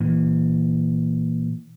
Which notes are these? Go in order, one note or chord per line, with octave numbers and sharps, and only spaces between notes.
A#2 E3